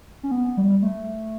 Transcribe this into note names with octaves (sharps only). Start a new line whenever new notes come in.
C#4
B3
G3
A3